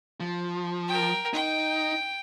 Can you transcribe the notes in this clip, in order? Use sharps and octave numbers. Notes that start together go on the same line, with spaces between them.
F3
A#4 G5
D#4 G5